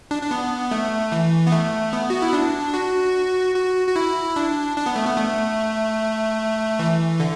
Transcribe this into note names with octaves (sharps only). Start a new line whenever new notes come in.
D4
D4
B3
A3
E3
B3
A3
B3
F#4
E4
D4
F#4
F#4
F#4
E4
D4
D4
B3
A3
B3
A3
E3
D3